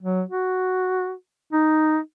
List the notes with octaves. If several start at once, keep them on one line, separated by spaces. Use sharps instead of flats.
F#3
F#4
D#4